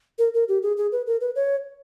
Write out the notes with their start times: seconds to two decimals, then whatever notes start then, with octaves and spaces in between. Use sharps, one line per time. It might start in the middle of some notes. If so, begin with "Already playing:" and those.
0.19 A#4
0.34 A#4
0.48 G4
0.63 G#4
0.77 G#4
0.92 B4
1.07 A#4
1.21 B4
1.36 C#5